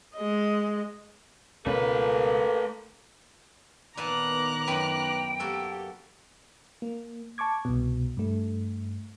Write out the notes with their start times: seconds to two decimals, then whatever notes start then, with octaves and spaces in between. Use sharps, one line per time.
0.15 G#3 D#5
1.66 C#2 B2 A3 A#3 C#4 A4 B4
3.97 A#2 D#3 B3 B4 A5 A#5 D6 F#6
4.67 F#2 B4 G5
5.39 A#3 F#4 G4 A4
6.82 A#3
7.38 A5 C#6 D6 G#6
7.65 C2 B2
8.17 G2 A3